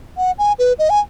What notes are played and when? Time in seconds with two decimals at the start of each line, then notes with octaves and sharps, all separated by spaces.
0.17 F#5
0.38 G#5
0.59 B4
0.79 D#5
0.90 G#5